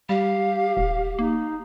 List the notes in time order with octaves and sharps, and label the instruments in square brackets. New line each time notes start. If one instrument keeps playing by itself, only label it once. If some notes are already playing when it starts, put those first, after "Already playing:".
[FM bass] G3 [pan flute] G4 [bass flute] F5
[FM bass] D#1
[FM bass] A#3 [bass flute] D#4